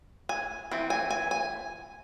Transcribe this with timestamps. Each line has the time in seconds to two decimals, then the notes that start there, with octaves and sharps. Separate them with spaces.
0.29 G#5
0.71 E3 C4
0.90 G#5
1.10 G#5
1.31 G#5